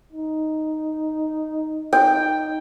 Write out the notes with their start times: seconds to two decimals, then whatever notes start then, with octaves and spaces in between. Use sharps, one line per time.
0.12 D#4
1.93 D#4 G5